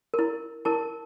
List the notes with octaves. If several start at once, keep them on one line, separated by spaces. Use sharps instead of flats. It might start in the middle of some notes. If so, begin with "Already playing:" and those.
A#4
E4
E4 A#4 A5